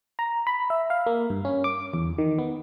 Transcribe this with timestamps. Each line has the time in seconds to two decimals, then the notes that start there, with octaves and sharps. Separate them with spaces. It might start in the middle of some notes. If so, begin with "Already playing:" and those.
0.19 A#5
0.47 B5
0.70 E5
0.90 F5
1.07 A#3
1.30 G2
1.45 C#4
1.64 D6
1.94 E2
2.18 D#3
2.39 B3